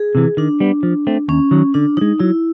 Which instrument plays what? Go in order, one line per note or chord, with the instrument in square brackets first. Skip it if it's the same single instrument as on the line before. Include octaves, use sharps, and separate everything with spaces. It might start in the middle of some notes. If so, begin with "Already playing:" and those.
Already playing: [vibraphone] G#4
[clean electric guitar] C3 E3
[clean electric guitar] D#3 [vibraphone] D4
[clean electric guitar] G3 B3
F3
A3 C4
[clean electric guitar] D#2 [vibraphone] C#4
[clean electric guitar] D#3 F#3
[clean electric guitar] D3 [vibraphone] D4
[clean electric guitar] F3 [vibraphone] D#4
[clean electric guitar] G#3
[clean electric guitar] F#3 [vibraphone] E4